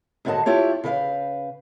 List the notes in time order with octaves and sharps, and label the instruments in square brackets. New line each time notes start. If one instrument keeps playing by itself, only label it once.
[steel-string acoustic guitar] D#2 G#2 D3 F#4 D#5 A5
E4 F4 G4 C#5
C#3 B4 D5 F5